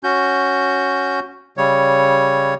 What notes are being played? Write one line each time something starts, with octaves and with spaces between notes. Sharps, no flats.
C#4 F#4 G6
C#3 G3 C#5